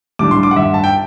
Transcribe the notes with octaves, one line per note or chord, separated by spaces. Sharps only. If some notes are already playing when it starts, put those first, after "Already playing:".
A2 G3 D4 D6
C6
D6
F#5
G2 E5
A5
G5